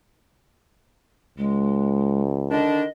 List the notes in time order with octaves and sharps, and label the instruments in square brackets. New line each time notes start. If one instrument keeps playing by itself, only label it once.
[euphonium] C#2 [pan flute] G#3
[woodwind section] D3 D#3 D4 [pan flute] D#5